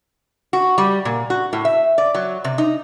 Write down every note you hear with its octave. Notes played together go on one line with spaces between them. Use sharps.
F#4
G3
A#2
F#4
A2
E5
D5
F#3
C3
D#4